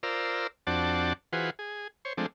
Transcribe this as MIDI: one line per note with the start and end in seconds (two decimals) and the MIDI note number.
0.03 0.47 65
0.03 0.47 70
0.03 0.47 72
0.03 0.47 74
0.03 0.47 88
0.67 1.13 41
0.67 1.13 60
0.67 1.13 62
0.67 1.13 66
0.67 1.13 74
0.67 1.13 81
1.33 1.50 52
1.33 1.50 65
1.33 1.50 66
1.33 1.50 68
1.33 1.50 71
1.33 1.50 72
1.59 1.88 68
2.05 2.13 72
2.05 2.13 73
2.18 2.26 53
2.18 2.26 56
2.18 2.26 57
2.18 2.26 60
2.18 2.26 62